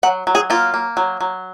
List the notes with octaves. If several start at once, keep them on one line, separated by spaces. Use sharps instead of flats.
F#3 F#5
F#3
G#4
A#3 F4
A#3
F#3
F#3